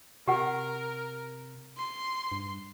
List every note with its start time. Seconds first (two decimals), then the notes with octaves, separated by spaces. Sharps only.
0.28 C3 G4 A#4 F#5
1.77 C6
2.32 G2